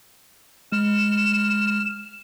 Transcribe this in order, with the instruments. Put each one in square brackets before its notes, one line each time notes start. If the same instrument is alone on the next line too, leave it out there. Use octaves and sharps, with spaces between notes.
[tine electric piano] G#3 [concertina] F6 [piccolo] E7